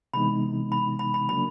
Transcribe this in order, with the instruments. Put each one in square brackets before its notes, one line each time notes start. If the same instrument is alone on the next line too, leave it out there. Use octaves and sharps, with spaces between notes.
[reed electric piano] C3 E3 G#3 B3 D#4 [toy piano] B5
[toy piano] B5
B5
B5
[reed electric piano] C#3 F#3 A#3 D4 [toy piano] B5